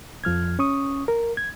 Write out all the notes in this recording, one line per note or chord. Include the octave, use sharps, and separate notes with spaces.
F2 F3 F6 G#6
C#4 C#6 D#6
A#4
G#6